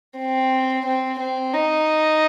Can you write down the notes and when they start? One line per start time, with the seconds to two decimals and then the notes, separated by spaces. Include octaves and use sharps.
0.18 C4
0.86 C4
1.19 C4
1.54 D#4